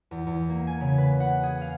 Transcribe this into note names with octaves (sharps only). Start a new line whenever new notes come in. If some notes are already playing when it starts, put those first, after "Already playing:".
E2
E2
A#3
G#5
C#3
B4
F#5
G#4
F5